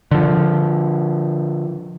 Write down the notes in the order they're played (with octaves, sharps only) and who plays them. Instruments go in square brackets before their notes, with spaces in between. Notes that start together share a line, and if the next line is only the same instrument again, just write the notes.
[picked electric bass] D3 F3